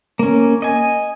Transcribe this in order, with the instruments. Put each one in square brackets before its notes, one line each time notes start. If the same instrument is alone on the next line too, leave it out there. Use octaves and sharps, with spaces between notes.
[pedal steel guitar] A#3 C#4
D#5 G#5